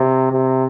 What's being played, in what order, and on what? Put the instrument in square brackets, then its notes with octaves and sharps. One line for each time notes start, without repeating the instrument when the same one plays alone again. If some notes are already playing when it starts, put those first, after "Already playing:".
Already playing: [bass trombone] C3
C3